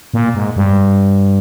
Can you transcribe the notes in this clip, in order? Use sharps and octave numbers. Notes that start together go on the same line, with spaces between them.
A#2
G#2
G2